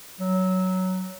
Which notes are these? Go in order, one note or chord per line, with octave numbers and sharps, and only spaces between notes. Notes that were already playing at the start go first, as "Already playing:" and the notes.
F#3